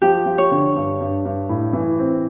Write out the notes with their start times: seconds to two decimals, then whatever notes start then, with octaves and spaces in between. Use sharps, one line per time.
0.02 F3 G4
0.26 F3
0.38 C#5
0.51 D3
0.76 G2
1.00 G2
1.25 G2
1.49 A2
1.73 E3
1.99 C4